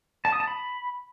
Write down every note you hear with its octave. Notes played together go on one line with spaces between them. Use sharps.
A5
D#6
A5
B5